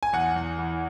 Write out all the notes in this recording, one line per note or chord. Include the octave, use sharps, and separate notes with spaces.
G#5
E2 F#5
E2
E3